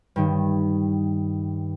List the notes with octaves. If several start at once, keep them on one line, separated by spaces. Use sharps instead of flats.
G2 D#3